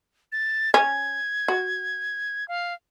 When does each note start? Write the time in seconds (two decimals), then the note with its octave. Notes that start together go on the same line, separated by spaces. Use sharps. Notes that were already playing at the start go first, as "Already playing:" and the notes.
0.32 A6
0.74 C#4 G#6
1.48 F#4
2.48 F5